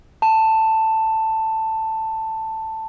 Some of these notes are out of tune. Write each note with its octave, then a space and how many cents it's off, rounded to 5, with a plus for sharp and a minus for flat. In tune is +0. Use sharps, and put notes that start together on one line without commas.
A5 +10